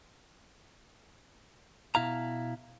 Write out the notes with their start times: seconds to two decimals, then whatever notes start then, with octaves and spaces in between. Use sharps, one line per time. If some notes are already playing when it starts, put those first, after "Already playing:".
1.95 B2 E4 F5 A#5